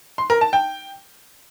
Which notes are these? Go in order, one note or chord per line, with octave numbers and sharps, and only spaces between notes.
C6
A#4
A5
G5